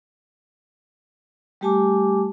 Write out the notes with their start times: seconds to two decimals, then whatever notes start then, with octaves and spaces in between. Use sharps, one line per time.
1.61 G3 A3 G4 G#5 A5 D6